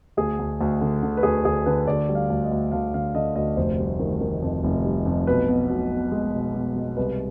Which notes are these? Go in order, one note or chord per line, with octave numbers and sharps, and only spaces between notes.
D2 G#4
D2
D2
D3
D3
B4
D2 G#4
D2 G#4
D3 B4
D2 D5
G3
F5
D2
D#5
D2
D2 F5
D3 F5
D3 D#5
D2 D#5
F1 C5
G3
D#3
D#3
F2
F1
G3
F2
B1 B4
B2
B1
B2
G#3
B2
B2
G#3
C2 B4